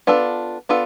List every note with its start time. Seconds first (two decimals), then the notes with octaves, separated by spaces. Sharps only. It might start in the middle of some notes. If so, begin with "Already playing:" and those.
0.07 B3 D4 F4 A4
0.69 B3 D4 F4 A4